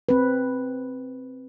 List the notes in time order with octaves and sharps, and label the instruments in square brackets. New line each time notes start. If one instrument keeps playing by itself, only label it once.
[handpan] C4 B4